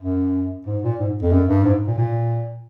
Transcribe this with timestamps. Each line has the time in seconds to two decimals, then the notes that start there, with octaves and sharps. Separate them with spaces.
0.02 F#2
0.67 G#2
0.83 A#2
1.00 G#2
1.22 F2
1.32 F#2
1.48 G2
1.65 G#2
1.87 A#2
1.98 A#2